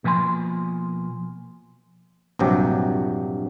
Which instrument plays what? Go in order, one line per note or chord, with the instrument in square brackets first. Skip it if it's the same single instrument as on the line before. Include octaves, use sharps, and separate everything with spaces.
[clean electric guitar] B2 F3 A#3 G#5 C6
[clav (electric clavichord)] A#1 G2 C3 F#3 G4